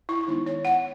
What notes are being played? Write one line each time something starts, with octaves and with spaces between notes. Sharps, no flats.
E4
D#3 G#3 B3 D#4
C#5
F#5